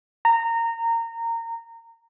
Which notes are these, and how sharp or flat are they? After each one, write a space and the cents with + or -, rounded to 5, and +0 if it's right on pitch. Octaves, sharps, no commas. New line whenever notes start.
A#5 -20